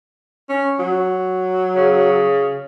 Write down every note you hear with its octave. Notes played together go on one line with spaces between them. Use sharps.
C#4
F#3
C#3